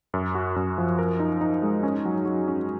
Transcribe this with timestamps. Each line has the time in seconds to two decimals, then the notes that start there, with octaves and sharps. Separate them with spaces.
0.14 F#2
0.35 F#4
0.56 F#2
0.78 F3
0.99 A#4
1.20 D#4
1.41 D#4
1.63 G#3
1.83 C#4
2.05 F#3
2.26 F#3
2.48 C#4